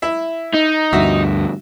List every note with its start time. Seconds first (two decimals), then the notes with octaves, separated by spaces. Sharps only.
0.02 E4 E5
0.54 D#4
0.93 D2 G2 F#4 E5